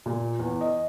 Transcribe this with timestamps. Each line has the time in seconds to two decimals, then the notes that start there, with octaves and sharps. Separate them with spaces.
0.06 A#2
0.39 E2
0.61 D#5